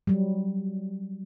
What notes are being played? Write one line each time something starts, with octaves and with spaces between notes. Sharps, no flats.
F#3 G3